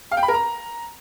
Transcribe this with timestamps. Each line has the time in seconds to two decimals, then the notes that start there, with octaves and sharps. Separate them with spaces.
0.11 F5
0.17 G5
0.23 B5
0.28 A#4
0.34 A#5